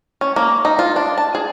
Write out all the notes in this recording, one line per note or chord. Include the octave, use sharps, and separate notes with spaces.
C#4
A#3
D#4
F4
D4
A5
G#4